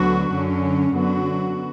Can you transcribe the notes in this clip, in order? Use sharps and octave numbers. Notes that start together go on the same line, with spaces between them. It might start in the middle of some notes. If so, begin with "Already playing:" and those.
Already playing: D2 D3 F#3 B3 F#4
F#2 D3 F#3 C#4
F#2 D3 F#3 B3 F#4